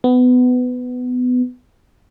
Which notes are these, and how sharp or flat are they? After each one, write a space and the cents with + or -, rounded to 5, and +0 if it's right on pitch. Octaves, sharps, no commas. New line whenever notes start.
B3 +20